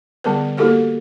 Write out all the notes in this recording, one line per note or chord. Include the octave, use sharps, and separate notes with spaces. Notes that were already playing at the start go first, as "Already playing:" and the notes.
D3 G3 B3 A#4 B4
A#3 E4 F#4 G4 A4 A#4